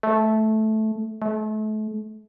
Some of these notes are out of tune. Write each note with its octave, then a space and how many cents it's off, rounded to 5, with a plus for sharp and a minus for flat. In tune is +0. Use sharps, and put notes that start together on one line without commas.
A3 -10
A3 -35